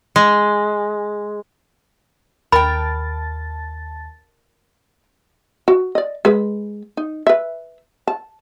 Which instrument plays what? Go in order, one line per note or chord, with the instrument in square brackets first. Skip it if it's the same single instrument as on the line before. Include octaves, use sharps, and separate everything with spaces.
[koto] G#3
[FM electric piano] D#2 A5 A6 [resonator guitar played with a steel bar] A#4 G5 [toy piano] B5
[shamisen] F#4
D5 D#5
G#3 B4
D#4
B4 E5
A5